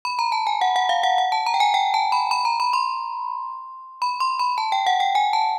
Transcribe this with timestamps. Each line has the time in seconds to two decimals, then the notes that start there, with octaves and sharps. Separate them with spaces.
0.05 B5
0.19 A#5
0.32 A5
0.47 G#5
0.61 F#5
0.76 F#5
0.89 F5
1.03 F#5
1.18 F#5
1.32 A5
1.46 A#5
1.54 G5
1.60 G#5
1.74 G5
1.94 A5
2.12 B5
2.31 B5
2.45 A#5
2.60 B5
2.73 C6
4.02 B5
4.20 C6
4.39 B5
4.58 A5
4.72 G5
4.86 F#5
5.00 G5
5.15 G#5
5.33 A5